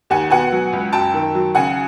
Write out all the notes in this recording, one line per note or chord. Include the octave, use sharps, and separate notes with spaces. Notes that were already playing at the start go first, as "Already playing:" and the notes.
D#2 F#5 G#5
B2 F#5 G#5
F#3
C#2
F#2 G5 A5
D#3
F#3
C#3 F#5 G#5